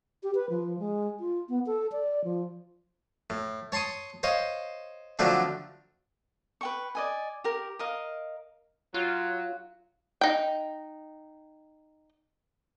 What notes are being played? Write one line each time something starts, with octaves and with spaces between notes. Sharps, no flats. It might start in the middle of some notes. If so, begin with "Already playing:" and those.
G4
B4
F3
G#3
F4
B3
A4
D5
F3
A2
C#5 A5 C6 C#6 D#6
C5 C#5 D#5 F5
D3 F3 F#3 A3 C4 D4
B4 G5 C#6
D5 D#5 G#5
G4 A#4
A#4 D#5 F5
F#3 F4
D#4 G5